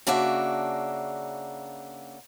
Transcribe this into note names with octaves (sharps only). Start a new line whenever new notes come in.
C#3 A#3 D4 F#4 E5